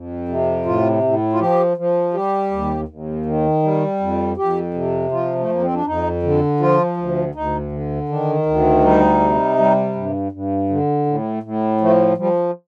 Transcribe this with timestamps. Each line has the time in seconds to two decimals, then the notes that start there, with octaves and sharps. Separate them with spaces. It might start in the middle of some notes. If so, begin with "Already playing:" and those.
Already playing: F2
0.28 C3
0.65 A2 F4
1.03 A2
1.33 F4
1.39 F3 G4
1.77 F3
2.14 G3 G4
2.51 D#2
2.88 D#2
3.26 D#3
3.63 G3
4.00 F2
4.37 F2 G4
4.74 C3
5.12 F3 F4
5.39 A3
5.49 F2 A#3
5.62 C4
5.74 D4
5.86 F2 D#4
6.23 D3
6.60 F3 F4
6.97 D2
7.35 D2 D#4
7.72 D3
8.09 D#3 D4
8.46 D2
8.83 G3 D#4
9.20 C3
9.58 G3
9.95 G2
10.32 G2
10.69 D3
11.06 A2
11.43 A2
11.80 F3 A3
12.18 F3 G3